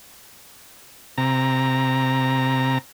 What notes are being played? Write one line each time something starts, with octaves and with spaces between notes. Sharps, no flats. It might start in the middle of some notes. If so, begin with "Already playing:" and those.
C3 A#5